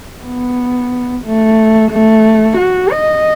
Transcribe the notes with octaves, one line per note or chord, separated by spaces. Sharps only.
B3
A3
A3
F#4
D#5